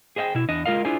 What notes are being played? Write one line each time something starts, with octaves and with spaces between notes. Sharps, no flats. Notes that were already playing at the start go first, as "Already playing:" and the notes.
G#4 C5 D#5 F5 G5
B2 E4
E2 D4 D#5
G#3 F4 A#4 D#5 F5
D4 E4 F4 G#4 C5 G#5